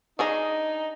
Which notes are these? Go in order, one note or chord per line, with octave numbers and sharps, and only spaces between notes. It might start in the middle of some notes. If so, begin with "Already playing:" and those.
D4 D#4 G#4 A#5